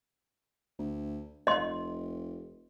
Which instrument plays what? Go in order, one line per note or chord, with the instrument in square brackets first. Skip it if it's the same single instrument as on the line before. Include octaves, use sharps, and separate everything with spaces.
[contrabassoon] D2
[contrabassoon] F1 [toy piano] D#5 C6